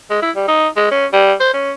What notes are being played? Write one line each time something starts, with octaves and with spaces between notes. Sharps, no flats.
G#3
E4
G3
D#4
G#3
C#4
G3
C5
C#4